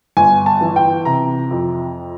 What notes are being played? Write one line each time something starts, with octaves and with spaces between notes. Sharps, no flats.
G1 G#5
A5
E3
G5
C3 A#5
F2